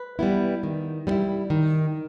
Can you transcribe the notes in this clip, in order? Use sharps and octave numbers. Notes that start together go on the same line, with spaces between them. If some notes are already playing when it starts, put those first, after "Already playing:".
Already playing: B4
G3 B3 E4
D#3
G3 B3 E4
D#3